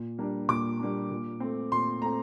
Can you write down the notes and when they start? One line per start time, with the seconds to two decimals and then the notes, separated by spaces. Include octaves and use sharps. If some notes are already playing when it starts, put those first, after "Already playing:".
Already playing: A#2
0.18 G3 A#3 D4
0.49 A#2 D6
0.79 G3 A#3 D4
1.11 A#2
1.40 A3 C4
1.72 A#2 C6
2.01 A3 C4 A#5